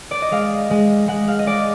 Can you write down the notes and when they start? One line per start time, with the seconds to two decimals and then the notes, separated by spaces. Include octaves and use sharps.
0.11 D5
0.22 D#5
0.32 G#3 F5
0.70 G#3
1.08 G#3 F#5
1.28 F5
1.39 D#5
1.46 G#3 D5